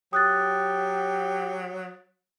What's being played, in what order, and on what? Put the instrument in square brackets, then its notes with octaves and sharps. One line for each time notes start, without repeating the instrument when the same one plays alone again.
[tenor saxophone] F#3 [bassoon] G4 [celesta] D#6 F#6 A6